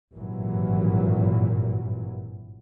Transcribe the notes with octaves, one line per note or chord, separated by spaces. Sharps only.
G#1 G2 A#2 E3 F#3